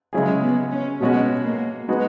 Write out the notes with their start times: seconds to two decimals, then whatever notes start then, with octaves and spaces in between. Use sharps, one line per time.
0.13 C#3 F#3 G#3 C#4 E4 G#4
0.42 B3
0.72 C#4
1.00 B2 G#3 B3 C#4 F#4
1.45 A#3
1.88 G#3 B3 D#4 F#4